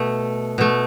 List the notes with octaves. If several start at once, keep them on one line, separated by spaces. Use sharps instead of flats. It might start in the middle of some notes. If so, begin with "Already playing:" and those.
Already playing: B2 A3
B2 A3